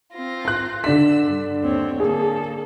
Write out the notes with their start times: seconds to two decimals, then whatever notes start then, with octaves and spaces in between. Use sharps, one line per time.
0.14 C4 F4 A#6
0.45 C6 F#6
0.84 D3 D4 E6 B6
1.27 G2
1.64 D#2 C4 C#5
2.00 D3 A#3 G#4 A4